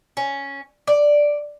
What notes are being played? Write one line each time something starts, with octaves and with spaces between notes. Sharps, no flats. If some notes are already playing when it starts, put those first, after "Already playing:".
C#4
D5